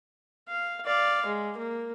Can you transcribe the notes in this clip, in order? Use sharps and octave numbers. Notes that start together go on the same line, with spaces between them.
F5
D5 F5
G#3
A#3